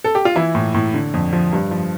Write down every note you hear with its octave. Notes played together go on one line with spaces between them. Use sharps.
A4
G4
F4
E3 E4
A2
A2
D3
F2
F3
G2
F3